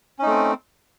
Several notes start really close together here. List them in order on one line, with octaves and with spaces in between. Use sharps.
C#4 D#4 A3 C4